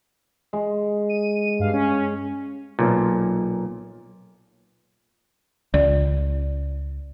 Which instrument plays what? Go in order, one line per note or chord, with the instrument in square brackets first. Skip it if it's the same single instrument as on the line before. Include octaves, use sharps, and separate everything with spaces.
[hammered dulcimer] G#3
[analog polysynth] D#7
G2 F5
C#4
[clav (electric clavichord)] B1 A#2
[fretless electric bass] C#2 [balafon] D5